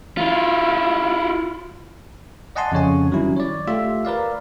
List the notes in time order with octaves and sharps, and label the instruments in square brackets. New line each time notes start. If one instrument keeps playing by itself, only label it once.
[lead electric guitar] E4 F4
[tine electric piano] D5 D#5 F#5 G#5 A5 C6
F2 C#3 C#5 G#5
D#3 F#3 G3 C#4 E4
C#5 D5
A3 F4 G4 E5
A#4 B4 D5 F5